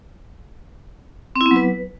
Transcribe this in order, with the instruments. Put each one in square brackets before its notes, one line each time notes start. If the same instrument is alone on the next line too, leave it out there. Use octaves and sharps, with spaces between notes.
[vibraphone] C4
E4
B3
F#3
B4